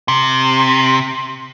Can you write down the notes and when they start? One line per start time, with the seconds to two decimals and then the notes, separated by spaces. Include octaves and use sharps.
0.08 C3